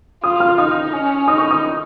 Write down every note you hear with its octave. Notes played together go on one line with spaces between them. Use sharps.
F4 D#6
F6
D#4 D#6
C#4
D#4 D#6
C#6
D#6